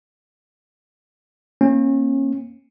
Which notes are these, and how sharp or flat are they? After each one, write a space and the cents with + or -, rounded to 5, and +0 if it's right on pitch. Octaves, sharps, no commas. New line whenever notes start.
A#3 +10 C#4 -30